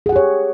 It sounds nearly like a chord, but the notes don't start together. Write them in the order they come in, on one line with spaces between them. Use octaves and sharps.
G#4 F#5 G4 C#5